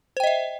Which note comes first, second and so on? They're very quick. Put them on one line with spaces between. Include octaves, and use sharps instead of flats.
C5 G5 D#5 E5